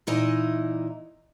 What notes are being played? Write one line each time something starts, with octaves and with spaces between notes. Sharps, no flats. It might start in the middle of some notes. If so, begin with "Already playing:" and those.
A#2 E3 D#4 E4 D#5